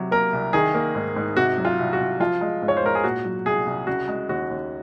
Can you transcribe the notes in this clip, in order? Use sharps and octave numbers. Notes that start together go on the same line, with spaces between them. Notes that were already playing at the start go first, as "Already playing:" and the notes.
Already playing: C3 F#3
A#3 A#4
C2
D#3 G#4
A#3
G#2
G#2
C3 F#4
F#3
F4
C2
F#4
C2
F3 F4
G#3
G#2
C#5
C5
G#2 A#4
G#4
A#2 F#4
F#3
C2 G#4
C2
C#3 F#4
G#3
D#2 F#4
D#2